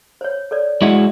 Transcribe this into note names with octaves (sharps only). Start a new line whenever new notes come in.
C5 C#5
A4 C#5 D5
G#3 E4 F#4 D#5 F#5 C#6